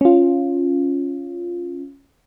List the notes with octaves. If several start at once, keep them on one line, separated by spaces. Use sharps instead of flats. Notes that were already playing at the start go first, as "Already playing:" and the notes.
C#4 F4